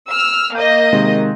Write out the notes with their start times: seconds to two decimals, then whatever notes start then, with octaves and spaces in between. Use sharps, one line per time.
0.10 E6 F6
0.55 A#3 D#5 G6
0.93 C3 D#3 G#3